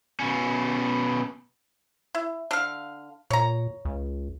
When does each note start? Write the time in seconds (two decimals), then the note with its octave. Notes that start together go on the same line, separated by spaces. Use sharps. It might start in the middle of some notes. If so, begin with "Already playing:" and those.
0.20 B2 C#4
2.15 E4
2.51 D3 F5
3.30 A#2 C#5 A#5
3.85 C#2